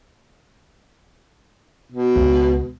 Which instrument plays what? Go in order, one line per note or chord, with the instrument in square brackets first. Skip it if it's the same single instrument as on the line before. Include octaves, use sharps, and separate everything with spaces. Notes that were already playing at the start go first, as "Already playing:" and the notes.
[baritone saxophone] B2
[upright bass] C#2